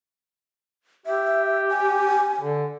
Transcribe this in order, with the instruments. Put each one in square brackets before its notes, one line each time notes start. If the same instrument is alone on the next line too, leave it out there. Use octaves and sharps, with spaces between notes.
[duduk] G4 [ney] E5
[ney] G#5
[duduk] D3